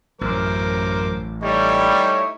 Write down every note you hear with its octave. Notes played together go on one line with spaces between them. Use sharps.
A1 F#2 A#4 C5 D6
G3 A3 D#4 E4 C#5